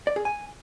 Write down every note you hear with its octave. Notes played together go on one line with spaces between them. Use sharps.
D5
G#4
G#5